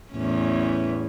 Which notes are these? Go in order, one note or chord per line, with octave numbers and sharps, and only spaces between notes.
E2 A2 C#4